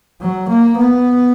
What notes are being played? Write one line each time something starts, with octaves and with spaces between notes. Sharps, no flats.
F#3
A#3
B3